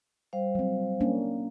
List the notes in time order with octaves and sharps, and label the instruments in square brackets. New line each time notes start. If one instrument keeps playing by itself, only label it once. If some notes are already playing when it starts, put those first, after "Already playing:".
[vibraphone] G3 C5 F5
[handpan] F#3 C4
A#3 C#4 D4